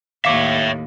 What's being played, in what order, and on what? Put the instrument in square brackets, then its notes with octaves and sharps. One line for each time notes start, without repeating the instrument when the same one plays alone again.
[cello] D#2 A2 [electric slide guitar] C#5 E5 [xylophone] F5 D6